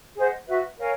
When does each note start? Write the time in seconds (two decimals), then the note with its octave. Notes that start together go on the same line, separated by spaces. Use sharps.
0.15 G#4 C5 D#5 F#5
0.47 F#4 B4 E5
0.78 A#4 C#5 F5 G#5